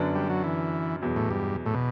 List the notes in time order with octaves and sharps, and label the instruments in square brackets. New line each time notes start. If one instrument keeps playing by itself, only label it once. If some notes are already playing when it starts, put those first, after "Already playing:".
Already playing: [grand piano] F#2 D3 F#3 B3 D4
[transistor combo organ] G3
F#3
E3
[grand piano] E2 B2 F#3
[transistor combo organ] A2
G2
A2
B2